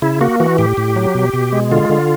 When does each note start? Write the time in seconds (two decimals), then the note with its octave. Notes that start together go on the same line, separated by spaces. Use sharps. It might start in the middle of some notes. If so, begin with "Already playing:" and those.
0.02 C#3 E4
0.21 A#3 F#4
0.40 E3 F#4
0.58 A2 G4
0.77 A2
0.96 F#3
1.15 B2
1.34 B2
1.52 G#3
1.71 D3 F4
1.89 D3